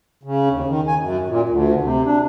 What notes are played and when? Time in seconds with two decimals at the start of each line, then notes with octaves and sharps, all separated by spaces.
0.23 C#3
0.50 D#2
0.67 D#3
0.87 G#5
1.00 F#2
1.28 A#2
1.49 D2
1.81 C3
2.04 D4